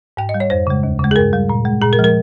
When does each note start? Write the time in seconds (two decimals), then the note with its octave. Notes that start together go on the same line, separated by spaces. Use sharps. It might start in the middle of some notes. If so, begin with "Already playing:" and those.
0.17 G#2 G5
0.29 D#5
0.34 G3
0.40 C#5
0.50 F2 C5
0.67 C#3 G#3
0.83 D#2
0.99 C#3 G#3
1.11 G#4
1.16 G2 A#4
1.33 G3
1.49 A#2
1.65 G#3
1.82 A#2 G#4
1.93 A#4
1.99 F3 G#3
2.04 A#4